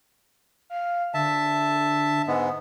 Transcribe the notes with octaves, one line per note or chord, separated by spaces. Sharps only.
F5
D3 E5 A5
G#2 G#3 B3